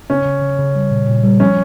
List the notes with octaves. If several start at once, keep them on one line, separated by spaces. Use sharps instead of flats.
C#3 C#4
C#3
C#3
C#3
G3
A#2
A#2
G3
F3 C#4